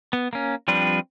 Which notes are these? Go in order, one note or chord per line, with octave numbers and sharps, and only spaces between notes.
B3
A#3 C#4
F3 G3 C4 D4 B4